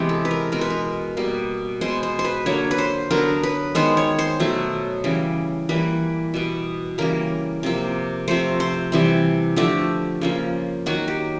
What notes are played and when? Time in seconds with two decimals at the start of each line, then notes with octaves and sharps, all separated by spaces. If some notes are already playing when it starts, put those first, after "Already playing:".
Already playing: C3 E3 G#3 B3 G4
0.09 A4
0.25 B4
0.31 A#4
0.52 B2 G#3 B3 A#4
0.61 B4
0.70 A#4
1.17 B2 G3 A#3
1.81 B2 G#3 B3 C5
2.03 C5
2.19 C5
2.25 B4
2.46 D3 F#3 A#3 C#5
2.71 B4
2.78 C5
3.10 D3 F#3 B3 A#4
3.43 B4
3.75 D#3 G#3 B3 C5
3.97 C#5
4.19 C5
4.40 B2 F#3 A3
5.04 C#3 E3 G3
5.69 E3 G3 A#3 B4
6.34 B2 G3 B3
6.98 C#3 E3 G3 A#3 A#4
7.63 C3 F3 A#3
8.28 C3 F3 A3 C5
8.60 C5
8.92 C3 E3 G3
9.56 D3 F3 A3 G4
10.21 C#3 F3 A#3
10.86 D#3 F#3 A#3 F#4
11.08 G4